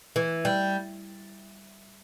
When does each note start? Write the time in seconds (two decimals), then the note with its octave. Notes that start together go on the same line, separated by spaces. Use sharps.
0.16 E3
0.45 G3